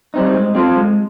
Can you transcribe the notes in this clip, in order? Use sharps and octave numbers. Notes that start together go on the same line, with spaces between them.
G3 C4 D#4
G#3
C4 F4 A4 C5
G#3